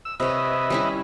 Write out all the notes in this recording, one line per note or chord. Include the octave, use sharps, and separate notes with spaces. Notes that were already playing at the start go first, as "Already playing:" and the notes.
E6
C3 B4 C#5 D#5 E5
G3 C#4 E4